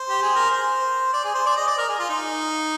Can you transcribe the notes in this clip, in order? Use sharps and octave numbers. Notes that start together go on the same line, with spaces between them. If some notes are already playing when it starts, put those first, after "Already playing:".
Already playing: C5
G4
G#4
A#4
C5
D5
G#4
C5
D5
D#5
D5
A#4
G#4
F4
D#4